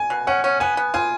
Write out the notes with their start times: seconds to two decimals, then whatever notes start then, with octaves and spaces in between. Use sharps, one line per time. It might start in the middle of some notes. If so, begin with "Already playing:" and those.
Already playing: G#5
0.10 B2
0.27 C#4 F#5
0.44 C#4
0.60 B3 G#5
0.77 B3
0.94 F4 G#5